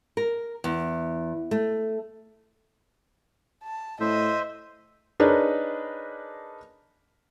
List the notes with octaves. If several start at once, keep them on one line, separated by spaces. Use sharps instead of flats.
A#4
E2
A3
A5
A2 C5 D#5 E5
D4 D#4 G#4 A#4 B4 C#5